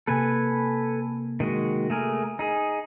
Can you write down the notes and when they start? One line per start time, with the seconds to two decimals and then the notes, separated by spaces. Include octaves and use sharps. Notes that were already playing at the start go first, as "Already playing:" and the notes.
0.07 C3 A#3 A4 B4 G#5
1.40 D#3 G#3 F#4
1.90 A3 G#4 A#4
2.39 D#4 G#4